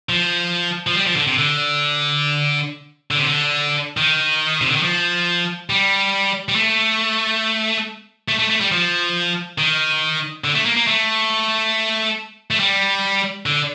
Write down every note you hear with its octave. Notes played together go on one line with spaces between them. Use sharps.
F3
F3
G3
F3
D3
C3
D3
D3
C3
D3
D#3
C3
D3
D#3
F3
G3
G3
A3
A3
A3
A3
G3
F3
D#3
D3
A3
A#3
A#3
A3
A3
G3
D3